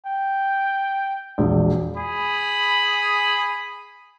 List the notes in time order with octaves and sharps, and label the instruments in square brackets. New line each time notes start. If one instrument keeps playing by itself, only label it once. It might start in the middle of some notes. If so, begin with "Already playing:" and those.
[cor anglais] G5
[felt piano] E1 A#1
[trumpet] G#4 [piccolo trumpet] B5